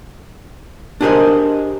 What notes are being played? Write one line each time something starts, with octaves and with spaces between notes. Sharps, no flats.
D4 G4 G#4 A#4 C5 D#5